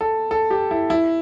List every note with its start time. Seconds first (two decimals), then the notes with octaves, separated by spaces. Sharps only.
0.01 A4
0.31 A4
0.50 G4
0.71 E4
0.90 E4